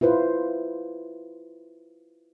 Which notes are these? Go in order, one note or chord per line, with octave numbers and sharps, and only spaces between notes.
E4 F4 B4 C5